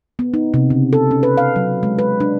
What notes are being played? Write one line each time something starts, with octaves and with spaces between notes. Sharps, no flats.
B3
D#4
C3
C#3
A4
C#4
B4
F5
F#3
G#3
B4
D4